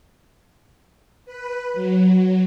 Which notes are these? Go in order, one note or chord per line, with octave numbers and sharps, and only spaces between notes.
B4
F#3